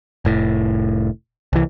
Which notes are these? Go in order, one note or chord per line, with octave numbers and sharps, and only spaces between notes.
F1 A2
C2 E3